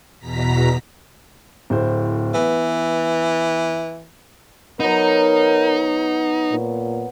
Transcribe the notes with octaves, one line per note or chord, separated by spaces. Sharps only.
E2 B2 A#5 B6
D1 A2 C5
E3 B3
F#3 B3 D#4 A#4
A#2